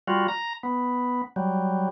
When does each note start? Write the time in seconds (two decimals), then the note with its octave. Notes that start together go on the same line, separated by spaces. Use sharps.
0.08 G3 F4 F#4
0.28 A#5
0.63 B3
1.36 F#3 G3